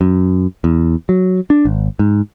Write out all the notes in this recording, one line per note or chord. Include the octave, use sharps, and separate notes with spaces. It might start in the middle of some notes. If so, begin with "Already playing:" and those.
F#2
E2
F#3
D4
G#1
G#2